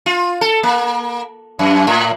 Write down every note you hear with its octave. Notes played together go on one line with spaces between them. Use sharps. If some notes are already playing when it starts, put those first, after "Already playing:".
F4
A4
A#3
F#2
A2